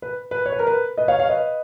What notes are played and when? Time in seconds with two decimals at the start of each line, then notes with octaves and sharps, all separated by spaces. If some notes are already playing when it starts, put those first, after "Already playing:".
0.02 B4
0.31 B4
0.46 C#5
0.52 B4
0.59 A#4
0.67 B4
0.97 B4 D#5
1.08 C#5 F5
1.19 C#5 F5
1.29 B4 D#5